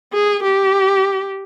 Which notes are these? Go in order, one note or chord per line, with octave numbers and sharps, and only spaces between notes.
G#4
G4